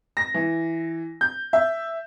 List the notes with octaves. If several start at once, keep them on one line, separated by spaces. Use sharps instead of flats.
A#6
E3
G6
E5